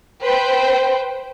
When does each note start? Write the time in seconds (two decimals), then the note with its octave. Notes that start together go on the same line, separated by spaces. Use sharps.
0.22 B4 C5 G5